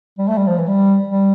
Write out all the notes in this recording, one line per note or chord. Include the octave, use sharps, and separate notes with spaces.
G3
A3
G3
F3
E3
G3
G3